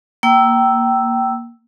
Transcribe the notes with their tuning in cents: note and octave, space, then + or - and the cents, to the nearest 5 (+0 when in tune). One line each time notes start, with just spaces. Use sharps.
A#3 +0 G5 -20 E6 +0